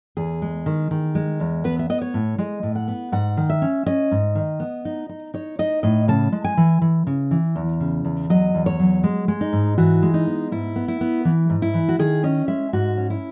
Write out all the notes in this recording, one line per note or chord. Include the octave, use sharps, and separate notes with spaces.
E2 G#4
G#3
D#3
D#3
G#3
E2
B3 B4
E5
B3 D#5
C#5
A2
G#3 D#5
A2
F#5
B3
G#2 F#5
D#3
E5
C#4
C#4 D#5
G#2
D#3
B3
D#4
D#4
D#4 C#5
D#4 D#5
A2 D#5
C#3 A5
G#3
G#5
E3
E3
C#3
E3
E2
C#3
E2
F#3 D#5
E2
C#5
F#3
G#3
G#3
D#4
G#2
E3 F#4
G#3
D#4
B3
G#2 E4
B3
E4
B3
E3
G#2
E4
E3
F#4
D#3 G#4
C#4 D#5
G#3 E5
G#2 F#4
C#4
E4